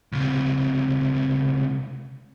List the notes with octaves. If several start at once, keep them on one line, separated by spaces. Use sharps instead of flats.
C#2 C3